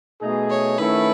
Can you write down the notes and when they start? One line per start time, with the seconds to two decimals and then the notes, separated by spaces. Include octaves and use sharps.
0.21 B2 A3 D#4 G#4
0.50 C#5
0.78 D#3 A3 C#4 E4 B4